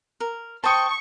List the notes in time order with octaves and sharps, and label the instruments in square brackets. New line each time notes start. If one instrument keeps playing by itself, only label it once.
[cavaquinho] A#4
[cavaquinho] C5 G5 [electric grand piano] A5 D#6 [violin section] C#6